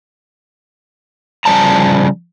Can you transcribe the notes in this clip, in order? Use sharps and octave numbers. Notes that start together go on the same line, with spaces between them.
C#3 F3 G3 A5 A#5